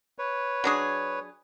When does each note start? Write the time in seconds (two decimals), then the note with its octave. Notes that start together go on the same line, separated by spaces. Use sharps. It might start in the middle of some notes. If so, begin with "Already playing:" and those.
0.18 B4 C#5
0.64 F#3 D4 G#4